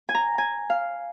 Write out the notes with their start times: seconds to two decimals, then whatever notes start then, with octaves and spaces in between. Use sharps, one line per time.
0.09 G#5
0.15 A#5
0.38 G#5
0.70 F5